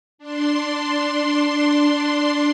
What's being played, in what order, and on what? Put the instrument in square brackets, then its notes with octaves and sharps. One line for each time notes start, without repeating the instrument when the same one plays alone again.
[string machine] D4 C6